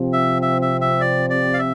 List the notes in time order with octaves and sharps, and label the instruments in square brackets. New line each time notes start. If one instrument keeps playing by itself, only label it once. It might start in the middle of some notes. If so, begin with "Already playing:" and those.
Already playing: [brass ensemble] C3 F3 C4
[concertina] E5
E5
E5
E5
D5
D5
F5
E5